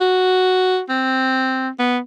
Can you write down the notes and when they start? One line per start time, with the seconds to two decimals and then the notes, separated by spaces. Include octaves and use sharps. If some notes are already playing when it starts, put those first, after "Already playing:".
0.01 F#4
0.89 C4
1.79 B3